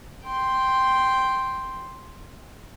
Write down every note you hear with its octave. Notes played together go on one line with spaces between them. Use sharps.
G5 C6